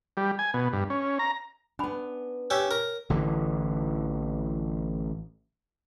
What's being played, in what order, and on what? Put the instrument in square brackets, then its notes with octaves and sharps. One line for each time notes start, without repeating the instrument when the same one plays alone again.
[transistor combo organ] G3
G#5
B2
G2
C#4
A#5
[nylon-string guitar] B3 D4 [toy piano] C#4 G#5 B5
[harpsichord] C#4 G4 E5 [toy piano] C#5
[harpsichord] A#4
[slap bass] A1 D3 E3